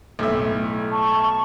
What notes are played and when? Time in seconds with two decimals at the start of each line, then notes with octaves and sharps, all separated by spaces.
0.19 B1 A2 E5
0.91 A5 C#6